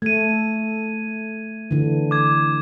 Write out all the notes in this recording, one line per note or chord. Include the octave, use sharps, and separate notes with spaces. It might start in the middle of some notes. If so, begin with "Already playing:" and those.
A3 G#6 D#7
D3 E3
D6 G#6